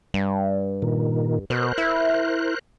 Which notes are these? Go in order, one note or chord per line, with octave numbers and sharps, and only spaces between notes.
G2
A#2 D#3
B2 A#4 C5 F#6
E4